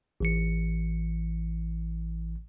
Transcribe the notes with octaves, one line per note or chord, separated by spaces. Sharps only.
A1 E3 C#7